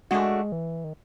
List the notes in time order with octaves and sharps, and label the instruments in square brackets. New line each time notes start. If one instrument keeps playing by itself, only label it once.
[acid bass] G#3 [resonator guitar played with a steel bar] A3 D4 F#4
[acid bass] E3
D#3